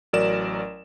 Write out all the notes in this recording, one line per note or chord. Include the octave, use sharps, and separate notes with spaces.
A1 F#3 A#4 D5 E7